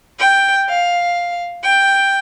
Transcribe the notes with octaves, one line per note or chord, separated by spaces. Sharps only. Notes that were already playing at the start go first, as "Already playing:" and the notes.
G5
F5
G5